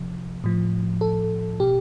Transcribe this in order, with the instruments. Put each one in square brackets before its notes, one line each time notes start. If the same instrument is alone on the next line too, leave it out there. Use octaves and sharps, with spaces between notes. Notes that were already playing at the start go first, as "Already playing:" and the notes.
Already playing: [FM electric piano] C3 F3
A2 F3
A4
B2 G4